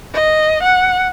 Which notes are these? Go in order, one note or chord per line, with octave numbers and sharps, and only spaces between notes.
D#5
F#5